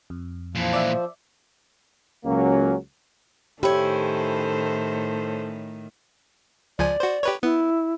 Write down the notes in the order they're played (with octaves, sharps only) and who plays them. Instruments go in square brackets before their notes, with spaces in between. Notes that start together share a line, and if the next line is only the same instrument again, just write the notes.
[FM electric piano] F2
[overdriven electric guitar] A#2 E3 [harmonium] F3
[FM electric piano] D5 E5
[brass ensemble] C#2 F#3 A#3 C#4
[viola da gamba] A2 D#3 [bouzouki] C#4 E4 [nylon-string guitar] G4 [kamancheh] A4 C5
[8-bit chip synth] C#2 F3 G#5 [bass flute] D5
[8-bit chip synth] F#4 C5
G4 B4 C#5
[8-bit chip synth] B3 [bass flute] E4